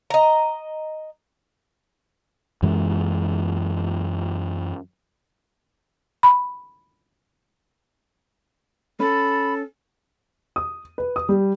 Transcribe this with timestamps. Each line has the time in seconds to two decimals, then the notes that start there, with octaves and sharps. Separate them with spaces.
0.10 D#5 A#5
2.63 F#2 E3 G#3
6.23 B5
9.00 C#4 A4 B5
10.56 D#6
10.98 B4
11.16 D#6
11.29 G3